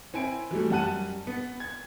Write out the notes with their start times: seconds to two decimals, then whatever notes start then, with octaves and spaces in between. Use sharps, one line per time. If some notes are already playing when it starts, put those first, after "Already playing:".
0.14 C4 E4 G#5 D7
0.51 E3 F#3 G3 A3
0.70 F#2 G3 F#5 A5 F#6 D#7
1.27 B3
1.60 G#6